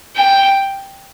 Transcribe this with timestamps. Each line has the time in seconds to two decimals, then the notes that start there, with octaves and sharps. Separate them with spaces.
0.17 G5